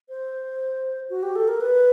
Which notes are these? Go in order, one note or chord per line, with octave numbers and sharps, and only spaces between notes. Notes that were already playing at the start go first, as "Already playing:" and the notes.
C5
F#4
G4
A4
A#4
B4